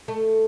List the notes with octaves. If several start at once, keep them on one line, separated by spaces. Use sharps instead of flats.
A3